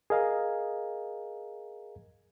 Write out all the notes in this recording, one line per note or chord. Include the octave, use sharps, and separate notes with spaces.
G#4 A#4 D#5 F5 G#5 A#5